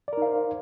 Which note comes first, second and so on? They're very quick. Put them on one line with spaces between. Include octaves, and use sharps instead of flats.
D5 A#4 D#4 F5 C5